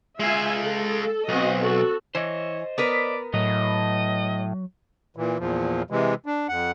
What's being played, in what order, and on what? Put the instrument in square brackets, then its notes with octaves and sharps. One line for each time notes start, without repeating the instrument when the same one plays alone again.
[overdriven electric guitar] G#3 F5 [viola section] F4 E5 G#5
[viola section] A4
[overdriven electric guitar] B1 [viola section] C4 F#4 D#5
[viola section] F#4 A4
[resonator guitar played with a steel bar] E3 [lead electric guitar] C5 D#5 [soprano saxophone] C#5
[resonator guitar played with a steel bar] B3 A#4 B4 [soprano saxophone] D5
[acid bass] A2 [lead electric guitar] F#3 [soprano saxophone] D#5
[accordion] A#2 E3
E2 A#2 F3
C3 E3 G#3
D4
F2 F#5